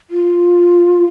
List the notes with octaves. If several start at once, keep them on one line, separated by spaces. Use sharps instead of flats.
F4